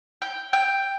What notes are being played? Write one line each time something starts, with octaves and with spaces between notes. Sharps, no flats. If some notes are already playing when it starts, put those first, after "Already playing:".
G5
G5